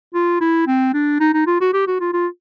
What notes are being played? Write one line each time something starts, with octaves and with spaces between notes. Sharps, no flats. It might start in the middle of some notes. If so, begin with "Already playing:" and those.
F4
E4
C4
D4
D#4
D#4
F4
F#4
G4
F#4
F4
F4